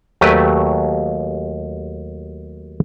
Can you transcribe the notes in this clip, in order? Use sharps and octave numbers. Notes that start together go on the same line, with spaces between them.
D#2 F#3 A3 G4 B4 G#5